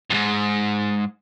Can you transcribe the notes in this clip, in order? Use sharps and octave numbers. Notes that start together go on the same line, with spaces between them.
F2 G#2